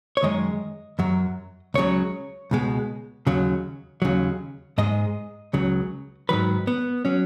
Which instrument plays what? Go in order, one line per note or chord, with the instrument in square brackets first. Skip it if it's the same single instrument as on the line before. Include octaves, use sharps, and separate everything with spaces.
[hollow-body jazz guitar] C#5
F#2 D#3 G#3 D#5
F#2 F#3
C#2 C#3 F#3 C#5
C#2 B2 G#3
D#2 C#3 F#3
D#2 C#3 F#3
G#2 G#3 D#5
C#2 C#3 F#3
G#2 D#3 F#3 B4
B3
F#3 C#4